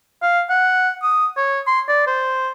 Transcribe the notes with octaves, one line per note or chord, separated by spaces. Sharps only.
F5
F#5
D#6
C#5
C6
D5
C5